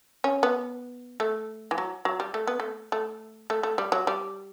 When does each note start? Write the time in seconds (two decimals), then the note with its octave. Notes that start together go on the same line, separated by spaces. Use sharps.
0.24 C#4
0.43 B3
1.20 A3
1.71 E3
1.78 F#3
2.05 F#3
2.20 G3
2.34 A3
2.47 B3
2.60 A3
2.92 A3
3.50 A3
3.63 A3
3.78 G3
3.92 F#3
4.07 G3